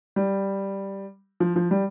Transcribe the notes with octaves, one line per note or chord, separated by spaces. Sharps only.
G3
F3
F3
G3